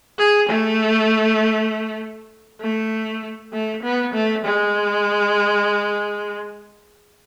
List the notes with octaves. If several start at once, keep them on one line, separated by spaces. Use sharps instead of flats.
G#4
A3
A3
A3
B3
A3
G#3